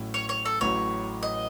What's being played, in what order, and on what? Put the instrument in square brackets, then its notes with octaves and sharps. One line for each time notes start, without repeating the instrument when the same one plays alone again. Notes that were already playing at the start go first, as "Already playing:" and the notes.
Already playing: [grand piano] A1 A2 F#3 C#4 E4
[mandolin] C#5
C#5
A4
[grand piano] A1 A2 F#3 [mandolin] C#5
[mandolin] D#5